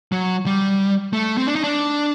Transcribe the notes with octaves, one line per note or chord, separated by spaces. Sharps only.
F#3
G3
A3
C4
D4
D#4
D4